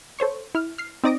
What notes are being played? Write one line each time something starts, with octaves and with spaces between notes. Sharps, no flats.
A4 C5 C#5 C#6
E4 F6
F6 C7
C4 D#4 D5 D#6 A#6 D7